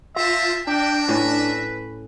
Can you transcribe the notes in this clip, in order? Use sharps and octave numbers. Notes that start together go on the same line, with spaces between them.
F4 C5 E5 A5 A#5
D4 A#4 E5 G5
A2 C#4 B4